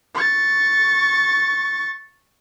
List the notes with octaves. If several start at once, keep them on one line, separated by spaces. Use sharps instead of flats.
C#6 A6